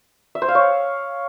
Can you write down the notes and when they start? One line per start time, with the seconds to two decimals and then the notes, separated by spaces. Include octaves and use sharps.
0.35 E5
0.42 C5
0.48 F5
0.55 C#5